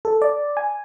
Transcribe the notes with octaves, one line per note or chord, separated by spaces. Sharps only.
A4
D5
G#5